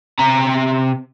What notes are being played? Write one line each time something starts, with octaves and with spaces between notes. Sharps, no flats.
C3 A#5